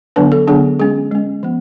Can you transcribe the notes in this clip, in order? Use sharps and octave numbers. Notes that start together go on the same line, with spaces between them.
D3 F#3 B3 D4 B4
A4
D3 F#3 B3 D4 G#4
G#3 C#4 G#4
G#3 C#4
F3 B3